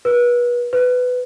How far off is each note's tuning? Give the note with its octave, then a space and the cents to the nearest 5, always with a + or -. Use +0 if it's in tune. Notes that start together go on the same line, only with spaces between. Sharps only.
B4 -30
B4 +15